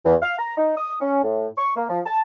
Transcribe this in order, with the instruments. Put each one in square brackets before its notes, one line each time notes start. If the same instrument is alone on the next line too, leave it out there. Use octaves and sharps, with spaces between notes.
[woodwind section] E2
F5
A#5
D#4
D#6
C#4
A2
C#6
A#3
F3
A5